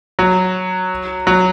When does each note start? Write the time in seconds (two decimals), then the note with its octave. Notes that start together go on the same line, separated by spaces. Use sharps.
0.19 F#3
1.27 F#3